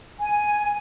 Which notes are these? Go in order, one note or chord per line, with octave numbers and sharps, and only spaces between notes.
G#5